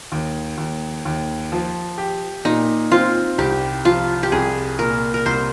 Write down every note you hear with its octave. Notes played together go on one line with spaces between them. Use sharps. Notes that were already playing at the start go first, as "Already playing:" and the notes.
D#2
D#2
D#2
F3
G4
A#2 D#4
C4 F4
C2 G4
F3 F4
G4
C2 G#4
A#2 A#4
A#4
C2 C5